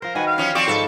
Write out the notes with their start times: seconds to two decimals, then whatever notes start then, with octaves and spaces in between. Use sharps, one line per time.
0.02 F3 A#4 C5
0.15 D#3 F#4 B4 G#5
0.27 F5
0.38 F3 C#4
0.55 F3 C4 D5 C#6
0.68 G#2 F3 A4 B4